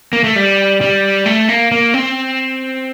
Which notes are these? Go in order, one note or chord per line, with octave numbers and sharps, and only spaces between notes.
A#3
A3
G3
G3
A3
A#3
A#3
C4